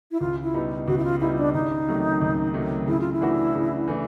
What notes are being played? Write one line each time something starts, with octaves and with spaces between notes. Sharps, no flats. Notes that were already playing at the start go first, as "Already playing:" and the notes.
E4
C#2 F4
E4
B2 G3 B3 D#4
C#2 F#4
E4
F4
B2 G3 B3 D#4 E4
D4
C#2 D#4
C3 D#3 F#3 A3
C#2
C3 D#3 F#3 A3
C#3 E4
F4
E4
E3 A3 D4 F#4
C#3
E3 A3 D4